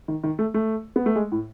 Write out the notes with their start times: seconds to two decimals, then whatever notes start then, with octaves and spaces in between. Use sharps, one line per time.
0.08 D#3
0.24 D#3
0.39 A3
0.54 A3
0.96 B3
1.06 A3
1.16 G#3
1.32 A2